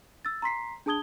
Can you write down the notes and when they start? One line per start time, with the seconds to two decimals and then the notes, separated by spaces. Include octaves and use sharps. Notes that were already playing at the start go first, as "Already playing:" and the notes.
0.25 E6 A6
0.42 A#5 C6 B6 C7
0.86 D4 G#4 A5 D#6 G#6 G7